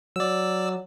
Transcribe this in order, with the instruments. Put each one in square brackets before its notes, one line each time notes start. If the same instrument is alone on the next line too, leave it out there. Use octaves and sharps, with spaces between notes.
[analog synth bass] F#3 [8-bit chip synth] D5 E6